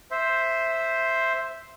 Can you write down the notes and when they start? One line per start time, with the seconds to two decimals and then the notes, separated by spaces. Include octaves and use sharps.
0.11 C5 E5